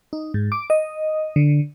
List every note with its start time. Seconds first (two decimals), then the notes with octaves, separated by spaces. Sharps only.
0.13 D#4
0.34 G#2
0.52 D6
0.70 D#5
1.36 D3